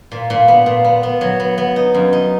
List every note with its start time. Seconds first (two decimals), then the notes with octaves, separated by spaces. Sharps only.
0.12 A#2
0.30 A#2
0.48 B3
0.66 A#2
0.84 B3
1.03 B3
1.21 F#3
1.40 B3
1.58 B3
1.76 D#4
1.94 F#2
2.13 D#4